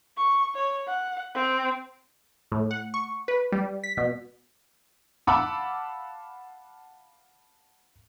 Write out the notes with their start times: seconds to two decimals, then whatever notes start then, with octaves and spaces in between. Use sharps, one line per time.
0.17 C#6
0.55 C#5
0.87 F#5
1.34 C4
2.52 A2
2.71 F#5
2.94 C#6
3.28 B4
3.52 G3
3.84 B6
3.97 B2
5.27 F5 F#5 A5 B5 D6 E6